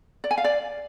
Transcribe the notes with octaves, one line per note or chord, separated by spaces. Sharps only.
D5
G#5
F5
D5